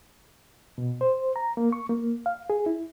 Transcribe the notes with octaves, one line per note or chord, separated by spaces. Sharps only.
B2
C5
A#5
A#3
C#6
A#3
F5
G#4
E4